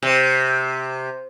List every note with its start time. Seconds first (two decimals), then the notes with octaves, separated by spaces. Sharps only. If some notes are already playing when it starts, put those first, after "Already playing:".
0.02 C3